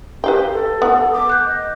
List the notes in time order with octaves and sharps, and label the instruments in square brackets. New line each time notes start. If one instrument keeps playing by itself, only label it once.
[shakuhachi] G4 [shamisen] B4 F5 G5
[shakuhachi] A4
[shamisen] B3 [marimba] F#5
[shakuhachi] D6
[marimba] F#6 G6
[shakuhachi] D#5